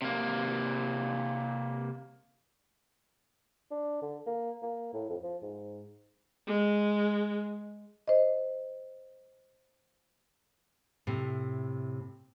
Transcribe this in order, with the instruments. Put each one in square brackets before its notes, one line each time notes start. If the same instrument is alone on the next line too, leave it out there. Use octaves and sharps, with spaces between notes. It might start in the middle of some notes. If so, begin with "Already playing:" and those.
[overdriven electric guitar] C3 A#3
[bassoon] D4
D3
A#3
A#3
A2
F2
F3
G#2
[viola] G#3
[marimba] C5 D#5
[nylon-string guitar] A2 C3